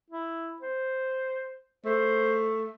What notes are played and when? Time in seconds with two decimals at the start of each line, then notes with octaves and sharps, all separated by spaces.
0.10 E4
0.62 C5
1.85 A3 C5